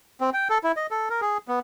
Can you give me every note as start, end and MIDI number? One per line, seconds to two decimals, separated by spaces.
0.21 0.30 60
0.34 0.48 79
0.49 0.58 69
0.64 0.72 64
0.77 0.87 75
0.91 1.09 69
1.10 1.21 70
1.21 1.38 68
1.48 1.59 59